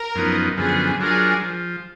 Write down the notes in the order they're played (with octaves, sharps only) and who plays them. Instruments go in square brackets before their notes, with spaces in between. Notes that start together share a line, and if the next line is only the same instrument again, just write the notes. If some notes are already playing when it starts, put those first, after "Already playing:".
Already playing: [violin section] A#4
[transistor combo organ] F#2 F3 B3 D#4
[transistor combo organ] F#2 D3 F3 B3 [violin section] G#4
[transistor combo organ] F#3 D4 F4 A#4 [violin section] G#4
[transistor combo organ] F3